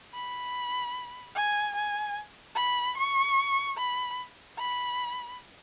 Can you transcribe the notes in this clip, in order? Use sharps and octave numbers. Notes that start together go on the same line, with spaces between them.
B5
G#5
G#5
B5
C#6
B5
B5